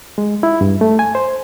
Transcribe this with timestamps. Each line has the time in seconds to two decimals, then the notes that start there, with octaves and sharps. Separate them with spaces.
0.18 G#3
0.43 E4
0.61 G2
0.81 A3
0.99 G#5
1.15 C5